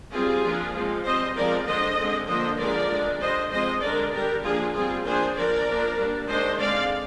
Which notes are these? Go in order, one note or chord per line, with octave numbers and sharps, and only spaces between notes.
G3 C4 F4 G#4
F3 A#3 D4
F3 G#3 C4
G3 C4 C5 D#5
F3 G#3 C4 A#4 D5
D3 G#3 D4 C5 D#5
D3 G#3 C4
D3 F3 A#3 D4 C5 D#5
D3 F3 G#3 D4 A#4 D5
D3 G#3 D4
G3 D4 C5 D#5
F3 G#3 C4 C5 D#5
D3 G#3 D4 A#4 D5
D3 G3 D4 G4 A#4
F3 A#3 D4 F4 G#4
G3 C4 F4 G#4
F3 A#3 D4 G#4 C5
F3 A#3 D4 A#4 D5
F3 A#3 D4
G3 A#3 D4
D#3 G#3 D4 C5 D#5
D3 G#3 C4 D5 F5